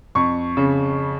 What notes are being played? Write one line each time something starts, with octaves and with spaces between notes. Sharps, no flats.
F2 C#6
C#3